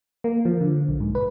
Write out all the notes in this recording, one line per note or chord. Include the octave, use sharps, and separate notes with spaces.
A#3
F3
D3
B1
G#2
B4